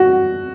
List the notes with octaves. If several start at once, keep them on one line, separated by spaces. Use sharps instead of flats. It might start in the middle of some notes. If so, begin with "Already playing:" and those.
Already playing: F#4